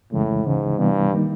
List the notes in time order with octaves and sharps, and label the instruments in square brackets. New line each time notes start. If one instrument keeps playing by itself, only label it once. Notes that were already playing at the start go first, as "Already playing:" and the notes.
[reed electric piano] F2 C#3 E3 G#3 [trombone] A2
[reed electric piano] D2 C#3 E3 [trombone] G#2
[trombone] G2 [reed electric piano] C3 E3 G3 B3
[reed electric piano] D#3 G3 A#3 D#4